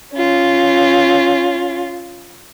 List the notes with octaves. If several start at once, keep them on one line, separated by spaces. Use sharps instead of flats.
C#4 F4